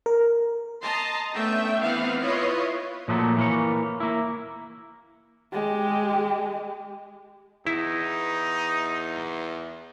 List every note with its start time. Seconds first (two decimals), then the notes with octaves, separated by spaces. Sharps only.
0.06 A#4
0.82 D#5 A5 A#5 C6
1.34 A3 B3 C#4 D4 E5 G5
1.81 E3 B3 C4 B4 F5 F#5
2.21 E4 F4 B4 C#5 D#5 C6
3.08 A#2 F3 F#3 A3 A#3
3.37 E3 A#3 C#5
4.00 A#3 E4
5.52 G#3 G4
7.67 E2 D#4 E4